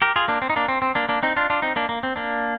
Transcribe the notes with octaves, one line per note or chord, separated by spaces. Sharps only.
G4 A#4
F4 G#4
A#3 D4
C4
D#4
A#3 D4
C4
C4
A#3 D4
A#3 D4
C4 D#4
D4 F4
D4 F4
C4 D#4
A#3 D4
A#3
C4
A#3 D4